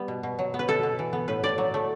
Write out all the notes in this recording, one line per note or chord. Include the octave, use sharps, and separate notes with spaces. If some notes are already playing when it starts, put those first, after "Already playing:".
Already playing: G3 B3
B2
B2
F#3
B3
B4
B2 A4
B2
E3
B3
A2 B4
A2 D5
F#3
A3